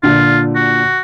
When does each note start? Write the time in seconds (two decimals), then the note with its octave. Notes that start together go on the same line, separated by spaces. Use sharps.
0.03 A#2 D3 F4
0.55 F#4